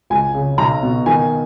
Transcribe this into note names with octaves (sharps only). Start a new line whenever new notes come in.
C#2 G#5
C#3
B1 A#5
B2
D#3 G#5